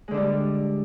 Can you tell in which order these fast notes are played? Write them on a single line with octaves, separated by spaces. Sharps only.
G#3 D3 D4 G3